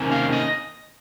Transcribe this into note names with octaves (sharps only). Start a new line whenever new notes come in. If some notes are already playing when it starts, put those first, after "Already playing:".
Already playing: C3 D#3 A#3 C#4
F5
D#5